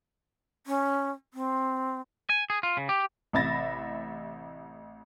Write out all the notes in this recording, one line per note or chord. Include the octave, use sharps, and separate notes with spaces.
C#4
C4
G#5
G#4
F4
C#3
G4
A1 C3 E5 B5 A6 A#6